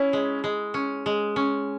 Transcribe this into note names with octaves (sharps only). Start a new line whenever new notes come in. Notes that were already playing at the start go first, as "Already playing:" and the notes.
Already playing: C#4 E4
G#3
G#3
C#4
G#3
C#4